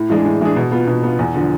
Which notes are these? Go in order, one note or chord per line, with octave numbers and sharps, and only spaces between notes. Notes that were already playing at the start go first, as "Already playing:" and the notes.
Already playing: A2
E3 G#3 D4 G#4
A2
E3 G#3 D4 G#4
B2
B3 F4
B2
B3 F4
E2
D3 F3